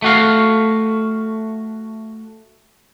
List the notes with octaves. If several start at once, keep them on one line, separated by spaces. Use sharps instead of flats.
A3 F#4 F5